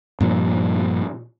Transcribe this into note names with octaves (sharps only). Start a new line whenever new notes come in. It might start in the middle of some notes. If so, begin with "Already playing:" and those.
G2 A#2 F3